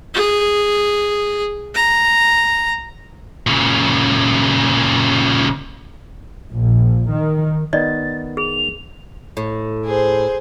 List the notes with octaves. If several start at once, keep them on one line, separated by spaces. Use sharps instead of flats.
G#4
A#5
A#2 C#3
A#1
D#3
D#3 B3 D5 D#5 A6
G#4 F7
A2
G#4 C5